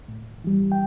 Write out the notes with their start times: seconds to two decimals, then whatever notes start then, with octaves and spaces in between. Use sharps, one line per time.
0.08 A2
0.44 E3 G3
0.72 G5